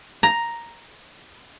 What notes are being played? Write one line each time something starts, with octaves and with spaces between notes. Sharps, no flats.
A#5